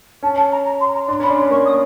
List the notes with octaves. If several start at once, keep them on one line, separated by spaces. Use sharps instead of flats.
C#4 A5
A5
A#5
A#5
C6
A#5
D4 C6
C#4
B5
D4
C6
C#4
A#3 C#6
D#6